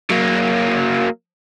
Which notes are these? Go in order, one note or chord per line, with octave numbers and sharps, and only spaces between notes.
F#3 A#3